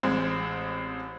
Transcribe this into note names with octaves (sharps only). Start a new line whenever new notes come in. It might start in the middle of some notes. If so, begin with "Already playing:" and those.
A1 G#3 C4